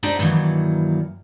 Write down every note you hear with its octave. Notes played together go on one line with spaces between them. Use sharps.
D4 D#4 G4 C5 D5 E5
G2 D#3 E3 F#3 A#3